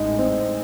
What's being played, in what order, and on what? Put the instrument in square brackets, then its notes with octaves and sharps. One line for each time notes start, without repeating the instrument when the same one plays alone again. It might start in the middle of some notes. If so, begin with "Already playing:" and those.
Already playing: [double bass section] A1 A2 G#3 [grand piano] D#4
[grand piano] C4